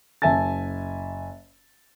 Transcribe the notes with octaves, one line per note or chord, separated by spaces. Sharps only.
F#1 E5 G#5 A5 A6